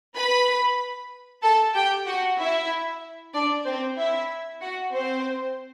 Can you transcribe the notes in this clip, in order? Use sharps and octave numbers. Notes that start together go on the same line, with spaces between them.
B4 B5
A4 A5
G4 G5
F#4 F#5
E4 E5
D4 D5
C4 C5
E4 E5
F#4 F#5
C4 C5